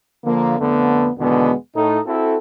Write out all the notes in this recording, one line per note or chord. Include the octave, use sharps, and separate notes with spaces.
D3 F3 A#3
F2 D3 A3 B3
E2 B2 D3 D#3 G#3 B3
A2 D#4 A4
C4 E4 F#4 A4